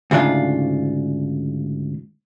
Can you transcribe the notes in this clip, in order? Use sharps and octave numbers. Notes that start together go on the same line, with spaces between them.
D2 G#2 C#3 D4 F4